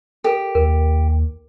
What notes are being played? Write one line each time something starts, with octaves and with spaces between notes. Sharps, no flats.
G4 A4 A#4
D#2 A#4